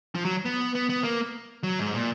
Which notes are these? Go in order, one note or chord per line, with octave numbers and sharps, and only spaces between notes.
F3
F#3
B3
B3
B3
A#3
F#3
G#2
A#2